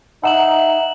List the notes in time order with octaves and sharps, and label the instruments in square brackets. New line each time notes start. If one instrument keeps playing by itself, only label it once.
[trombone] D#4 [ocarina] E5 [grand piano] F#5 [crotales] E6 E7 F#7